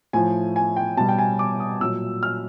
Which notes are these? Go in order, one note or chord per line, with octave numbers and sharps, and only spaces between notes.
A2 F3 G#5
G#5
G5
B2 G3 A5
G5
G#5
D6
D#6
A#2 F#3 E6
F6